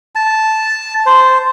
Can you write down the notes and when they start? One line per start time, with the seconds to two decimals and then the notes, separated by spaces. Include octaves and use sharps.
0.15 A5
1.06 C5